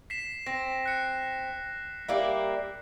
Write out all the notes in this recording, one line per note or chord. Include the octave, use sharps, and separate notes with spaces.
B6 C7 E7
C4 A#6
F#6 C#7
G3 A#3 E4